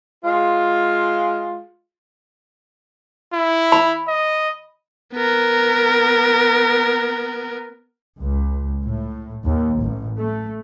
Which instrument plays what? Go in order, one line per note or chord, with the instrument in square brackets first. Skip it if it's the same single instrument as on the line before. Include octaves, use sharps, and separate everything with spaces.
[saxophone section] G#3 F4
[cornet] E4
[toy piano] B5
[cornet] D#5
[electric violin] B3 A#4
[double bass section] C#2
A2
D#2
A1
A3